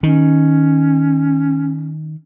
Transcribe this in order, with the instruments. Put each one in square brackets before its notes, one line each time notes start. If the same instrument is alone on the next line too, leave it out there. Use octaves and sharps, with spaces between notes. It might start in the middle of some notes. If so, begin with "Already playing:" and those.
[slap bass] D#3 [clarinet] C#4